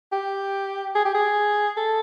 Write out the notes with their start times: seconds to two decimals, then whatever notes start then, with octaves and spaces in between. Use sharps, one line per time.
0.12 G4
0.95 G#4
1.05 G4
1.14 G#4
1.77 A4